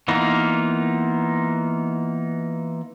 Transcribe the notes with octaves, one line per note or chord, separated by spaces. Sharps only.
E3 A#3 B3 D#4 F4